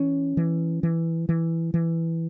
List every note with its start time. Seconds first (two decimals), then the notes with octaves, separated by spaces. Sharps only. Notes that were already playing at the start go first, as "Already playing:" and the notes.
Already playing: E3 C#4
0.37 E3
0.83 E3
1.29 E3
1.74 E3